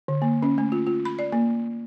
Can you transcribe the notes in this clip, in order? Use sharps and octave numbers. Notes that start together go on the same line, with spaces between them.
D3
A#3
C#4
A3
F4
F4
B5
D5
A#3